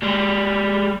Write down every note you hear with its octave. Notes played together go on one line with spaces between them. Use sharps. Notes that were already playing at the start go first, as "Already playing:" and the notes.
G3 G#3